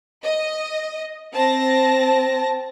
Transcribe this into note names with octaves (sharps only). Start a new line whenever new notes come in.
D#5
C4 A5 A#6